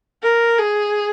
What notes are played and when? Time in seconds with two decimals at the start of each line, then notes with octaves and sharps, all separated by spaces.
0.23 A#4
0.58 G#4